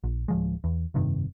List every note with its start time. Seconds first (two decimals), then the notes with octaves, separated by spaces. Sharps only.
0.04 A#1
0.28 D1 F3 G#3
0.64 E2
0.94 F1 G2 C3 D#3